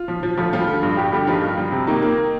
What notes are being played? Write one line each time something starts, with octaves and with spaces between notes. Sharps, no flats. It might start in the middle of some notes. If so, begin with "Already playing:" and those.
Already playing: F4
F3
F3
D2 F3 F4
F3 G3 F4
D3
G2
G2 G3 G4
D3 G3 G4
D#3 F3 F4
G2
G3
C3
D#3 A#3 D#4
A#3